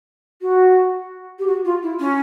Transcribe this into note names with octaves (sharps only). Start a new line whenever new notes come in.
F#4
G4
F#4
F4
E4
C#4